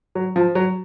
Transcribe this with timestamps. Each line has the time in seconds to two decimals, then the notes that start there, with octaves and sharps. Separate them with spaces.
0.15 F#3
0.36 F3
0.55 F#3